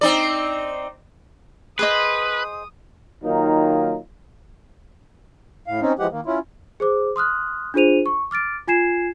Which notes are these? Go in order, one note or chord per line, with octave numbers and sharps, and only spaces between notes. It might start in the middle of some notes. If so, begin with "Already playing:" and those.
C4 D#4 D5
G#4 B4 C5 D#5 D#6
D#3 F#3 A#3 D#4 F4
A2 F5
C4 C#4 D#4
E3 F3 G#3 G4 F#5
D#3 A#3
C#4 E4 F4
G#4 C5 D6
C6 D#6 F6 F#6
D4 F4 G#4 C5 D#7 F7
C#6
D6 F6 A6 D7
F4 G#5 G#6 C7 E7